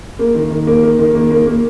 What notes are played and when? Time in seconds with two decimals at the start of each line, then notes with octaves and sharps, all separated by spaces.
0.19 A#3
0.35 D#3
0.51 D#3
0.67 A#3
0.83 A#3
0.98 D#3
1.15 A#3
1.30 A#3
1.47 A#3